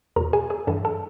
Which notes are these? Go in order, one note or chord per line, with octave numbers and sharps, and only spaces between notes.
E2 B2 A#4 A#5
G#4 G#5
G#4 G#5
G2 E3 A4 A5
A4 A5